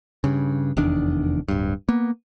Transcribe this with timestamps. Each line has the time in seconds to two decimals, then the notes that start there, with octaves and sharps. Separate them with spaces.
0.24 G2 C#3
0.77 F1 E2 D#3 D4
1.48 D1 G2
1.89 A#3 B3